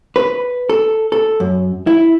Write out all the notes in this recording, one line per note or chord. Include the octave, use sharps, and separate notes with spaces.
B4
A4
A4
F#2
E4